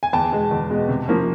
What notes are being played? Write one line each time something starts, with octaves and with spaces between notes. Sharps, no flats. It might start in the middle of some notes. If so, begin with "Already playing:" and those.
G#5
E2 G5 A5
B2 G#3
E2
B2 G#3
C3
F3 A#3 C#4